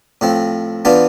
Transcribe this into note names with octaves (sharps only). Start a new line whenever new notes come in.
A2 F3 C4
E3 B3 D4 F4